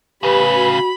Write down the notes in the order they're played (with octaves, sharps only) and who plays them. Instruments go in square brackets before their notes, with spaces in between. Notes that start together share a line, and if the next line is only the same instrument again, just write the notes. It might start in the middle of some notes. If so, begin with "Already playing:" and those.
[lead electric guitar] A2 C#3 [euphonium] G4 [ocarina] B4 [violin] B5
[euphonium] F#4